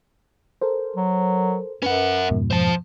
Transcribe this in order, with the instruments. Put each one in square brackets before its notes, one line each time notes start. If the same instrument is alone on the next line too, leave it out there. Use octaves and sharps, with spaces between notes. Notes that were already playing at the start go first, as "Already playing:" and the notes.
[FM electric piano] A4 A#4 C5
[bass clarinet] F#3
[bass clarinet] F#2 [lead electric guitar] C#4 F#5 [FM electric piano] B4
[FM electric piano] F2 G#2 B2
[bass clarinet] F3 [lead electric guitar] C5 A5